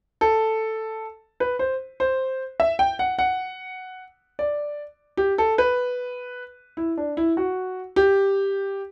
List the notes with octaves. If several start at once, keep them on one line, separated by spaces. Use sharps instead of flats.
A4
B4
C5
C5
E5
G5
F#5
F#5
D5
G4
A4
B4
E4
D4
E4
F#4
G4